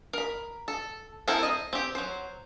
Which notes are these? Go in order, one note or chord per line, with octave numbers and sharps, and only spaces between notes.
A#4 B5
A4
C4 E4 A4 A#4 C5
D#5
C4 G4
F#3 C5